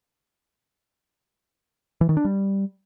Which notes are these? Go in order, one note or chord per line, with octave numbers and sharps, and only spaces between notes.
E3
D#3
D4
G3